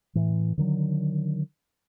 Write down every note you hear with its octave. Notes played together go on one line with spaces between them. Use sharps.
A2 E3
D3 D#3 F#3